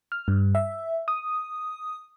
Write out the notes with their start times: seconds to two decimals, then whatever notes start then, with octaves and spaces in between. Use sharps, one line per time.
0.12 F6
0.28 G2
0.55 E5
1.08 D#6